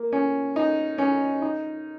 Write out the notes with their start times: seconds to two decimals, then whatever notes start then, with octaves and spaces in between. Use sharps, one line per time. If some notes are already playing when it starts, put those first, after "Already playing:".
Already playing: A#3
0.12 C#4
0.56 D#4
0.98 C#4
1.42 D#4